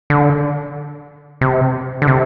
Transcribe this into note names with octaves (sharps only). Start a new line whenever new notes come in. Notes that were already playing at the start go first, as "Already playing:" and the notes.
D3
C3
D3
C3